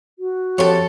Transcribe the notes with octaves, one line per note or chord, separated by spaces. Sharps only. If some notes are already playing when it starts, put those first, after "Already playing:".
F#4
F2 G4 A4 C#5